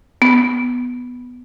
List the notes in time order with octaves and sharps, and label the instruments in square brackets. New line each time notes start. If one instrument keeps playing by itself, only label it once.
[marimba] B3